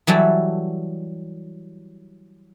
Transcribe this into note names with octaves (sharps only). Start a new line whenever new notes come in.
E3 F#3 G3 A4